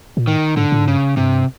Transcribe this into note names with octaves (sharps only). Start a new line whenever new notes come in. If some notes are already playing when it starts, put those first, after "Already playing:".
A#2
A2 D#3
G#2 D3
A2
G#2
G2 C#3
G2 C3